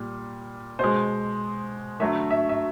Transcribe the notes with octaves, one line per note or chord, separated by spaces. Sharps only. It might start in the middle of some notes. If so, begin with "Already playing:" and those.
Already playing: A#2 G3
B2 G#3 C5
D3 F#3 A3 E5
E5
E5